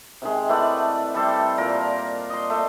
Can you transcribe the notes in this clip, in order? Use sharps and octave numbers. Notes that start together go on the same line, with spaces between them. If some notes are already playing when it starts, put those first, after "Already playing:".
C3 D#3 G#3
E3 A3 D5 F#5
G3 A4 C5
A#2 A#4 C5 C6
D#5 C6
A3 A5